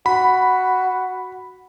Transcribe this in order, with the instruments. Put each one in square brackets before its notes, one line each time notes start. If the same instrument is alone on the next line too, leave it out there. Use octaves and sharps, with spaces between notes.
[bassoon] F#4 [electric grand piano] B5